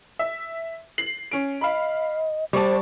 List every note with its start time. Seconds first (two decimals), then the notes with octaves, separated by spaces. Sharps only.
0.19 E5
0.98 C7 F#7
1.32 C#4 D7
1.61 D#5 F5 B5
2.53 G3 C5 D5 A5 C#6